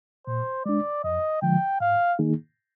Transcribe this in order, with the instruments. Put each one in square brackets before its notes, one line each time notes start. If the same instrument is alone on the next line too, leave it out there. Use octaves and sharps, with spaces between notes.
[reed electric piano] A#2 [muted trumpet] C5
[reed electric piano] G#3 D4 [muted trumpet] D5
[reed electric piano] F2 [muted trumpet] D#5
[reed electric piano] D3 F3 G#3 [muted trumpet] G5
[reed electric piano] G#2 [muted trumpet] F5
[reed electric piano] D#3 A#3 D#4 G#4